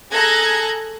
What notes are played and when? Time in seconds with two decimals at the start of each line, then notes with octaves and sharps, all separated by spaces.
0.13 G#4 A4 A#5 F#6 G#6 A#6